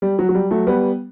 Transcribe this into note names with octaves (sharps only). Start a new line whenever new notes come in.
G3
F#3
F#3
G3
F#3 A3
G3 B3